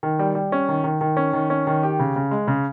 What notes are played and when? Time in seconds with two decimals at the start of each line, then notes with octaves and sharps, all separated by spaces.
0.03 D#3
0.19 G3
0.35 G3
0.52 C#4
0.69 D#3
0.84 D#3
1.01 D#3
1.17 C#4
1.33 D#3
1.50 C#4
1.67 D#3
1.83 G4
1.99 C#3
2.16 C#3
2.31 G#3
2.48 C#3